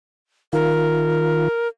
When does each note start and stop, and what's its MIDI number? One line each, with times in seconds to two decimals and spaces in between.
0.53 1.48 51
0.53 1.48 65
0.53 1.68 70